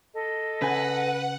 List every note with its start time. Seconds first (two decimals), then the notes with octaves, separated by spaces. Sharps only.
0.14 A4 D#5
0.62 C#3 B4 F#5 G#5